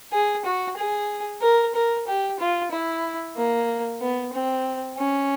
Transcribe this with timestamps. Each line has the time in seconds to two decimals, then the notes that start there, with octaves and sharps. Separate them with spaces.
0.13 G#4
0.45 F#4
0.77 G#4
1.42 A#4
1.75 A#4
2.07 G4
2.40 F4
2.71 E4
3.36 A#3
4.01 B3
4.34 C4
4.98 C#4